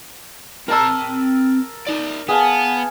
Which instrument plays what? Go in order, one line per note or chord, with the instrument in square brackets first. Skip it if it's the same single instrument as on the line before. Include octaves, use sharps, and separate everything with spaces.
[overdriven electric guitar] C4 A#5 [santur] A#4 A5 E6
[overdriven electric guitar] D#4 D5
[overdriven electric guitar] B3 [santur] G#4 F5 A5